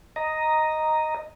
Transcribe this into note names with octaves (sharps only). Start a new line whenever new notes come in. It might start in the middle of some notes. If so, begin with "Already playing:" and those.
D#5 A#5